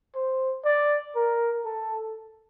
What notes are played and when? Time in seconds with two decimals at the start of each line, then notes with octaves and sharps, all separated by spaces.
0.15 C5
0.65 D5
1.16 A#4
1.65 A4